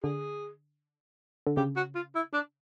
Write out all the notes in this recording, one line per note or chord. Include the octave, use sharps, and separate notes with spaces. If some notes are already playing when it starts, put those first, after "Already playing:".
D3 G#4
D3
C#3 G4
F#4
F4
E4
D4